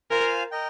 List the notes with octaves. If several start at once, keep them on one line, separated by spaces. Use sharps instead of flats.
F4 A#4 C5 F5 G#5
A#4 D#5 G5